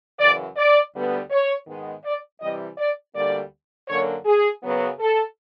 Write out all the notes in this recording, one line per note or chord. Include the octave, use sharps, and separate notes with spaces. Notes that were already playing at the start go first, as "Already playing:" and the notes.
F#2 C#3 E3 D5
D5
D2 D3 G3 B3
C#5
G#2 D#3 G#3 B3
D5
C3 E3 G3 D#5
D5
D2 D3 G3 A#3 D5
F#2 D3 F#3 A#3 C#5
G#4
F#2 C#3 F#3 B3
A4